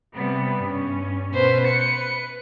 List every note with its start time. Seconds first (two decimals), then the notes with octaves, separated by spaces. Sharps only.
0.14 C3 G3 B3
0.58 G2 C#4
1.34 B2 B4 C5
1.68 B4 C#7